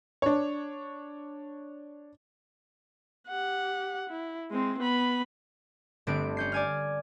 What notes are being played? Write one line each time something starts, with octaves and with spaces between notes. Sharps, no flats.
D4 C#5
G4 F#5
E4
G#3 C4
B3 B5
G1 A3 C4 D4 D7
C#4 G6 C7
D5 G#5 F6